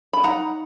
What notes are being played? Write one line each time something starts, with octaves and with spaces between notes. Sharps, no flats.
B5
D#4 F#5 A#5